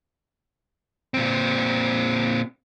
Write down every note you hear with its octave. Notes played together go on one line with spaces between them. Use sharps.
A#2 C4